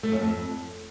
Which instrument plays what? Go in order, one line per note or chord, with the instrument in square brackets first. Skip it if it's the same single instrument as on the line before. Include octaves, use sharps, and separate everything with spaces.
[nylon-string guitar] A3
F#2
F2